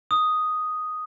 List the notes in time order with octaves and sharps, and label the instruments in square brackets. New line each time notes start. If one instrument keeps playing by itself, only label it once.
[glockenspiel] D#6